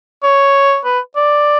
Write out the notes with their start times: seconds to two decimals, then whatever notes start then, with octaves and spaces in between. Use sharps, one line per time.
0.23 C#5
0.85 B4
1.16 D5